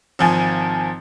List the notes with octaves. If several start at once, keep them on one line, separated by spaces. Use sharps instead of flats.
G#1 F3 G#5